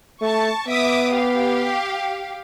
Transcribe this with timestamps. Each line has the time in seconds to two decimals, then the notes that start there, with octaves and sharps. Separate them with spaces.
0.22 A3 A5 C#6
0.68 B3 E5 D6 D#6
1.12 G4 F5